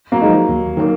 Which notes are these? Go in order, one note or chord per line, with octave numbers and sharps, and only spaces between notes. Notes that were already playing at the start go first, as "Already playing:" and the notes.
F#3 A#3
F3 G#3 D#4
D#2
D#3 F#3 A#3